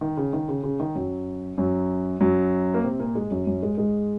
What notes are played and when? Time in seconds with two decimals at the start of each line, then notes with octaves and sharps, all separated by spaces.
0.01 D#3
0.17 C#3
0.33 D#3
0.49 C#3
0.63 C#3
0.80 D#3
0.95 F#2 F#3
1.58 F#2 F#3
2.21 F#2 F#3
2.74 A#3
2.84 C3 C4
3.00 A#2 A#3
3.15 G#2 G#3
3.31 F#2 F#3
3.47 F#2 F#3
3.62 G#2 G#3
3.78 G#2 G#3